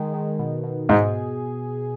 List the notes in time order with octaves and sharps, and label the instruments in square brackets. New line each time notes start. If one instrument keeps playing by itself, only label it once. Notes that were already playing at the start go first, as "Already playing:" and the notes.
Already playing: [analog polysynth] D#3 G#3
D#3
B2
B2
[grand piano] G#2 [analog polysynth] G#4